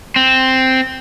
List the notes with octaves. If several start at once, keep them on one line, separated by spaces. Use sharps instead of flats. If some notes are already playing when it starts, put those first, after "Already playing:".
C4